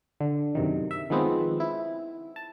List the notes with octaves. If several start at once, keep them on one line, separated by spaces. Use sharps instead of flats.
D3
F#2 C3 D#3
E5
D#3 F3 G#3 B3 C4
E4
A5